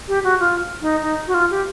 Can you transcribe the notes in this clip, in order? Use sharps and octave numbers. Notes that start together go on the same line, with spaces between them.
G4
F#4
F4
D#4
D#4
F#4
F4
G4